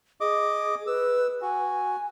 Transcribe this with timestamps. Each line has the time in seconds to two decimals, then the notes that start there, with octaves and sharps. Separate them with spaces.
0.21 G#4 D#5 D6
0.87 B4 E6
1.42 F#4 G#5